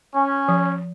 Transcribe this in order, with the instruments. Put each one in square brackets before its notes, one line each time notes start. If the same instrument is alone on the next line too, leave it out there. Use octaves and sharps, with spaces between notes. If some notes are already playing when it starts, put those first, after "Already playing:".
[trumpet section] C#4
[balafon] F3